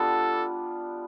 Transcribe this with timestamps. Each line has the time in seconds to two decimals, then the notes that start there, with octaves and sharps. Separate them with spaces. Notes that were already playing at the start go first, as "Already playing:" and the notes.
Already playing: G3 B3 D4 F4 A4